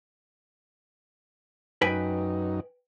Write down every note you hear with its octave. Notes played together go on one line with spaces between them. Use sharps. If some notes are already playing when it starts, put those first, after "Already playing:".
F#2 D#4 B4 G5 G#5